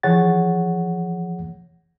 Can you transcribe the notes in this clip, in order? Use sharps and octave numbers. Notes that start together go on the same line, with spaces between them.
E3 F3 G#4 C#5 F#5 A6